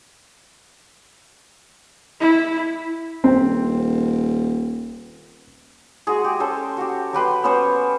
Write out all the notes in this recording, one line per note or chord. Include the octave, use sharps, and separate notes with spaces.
E4
D#1 C4
G#3 F#4 G#4
G4
C#4 A4 C5
F#4 G4
F#3 G4 B4 C6
B3 C#4 C5 C#5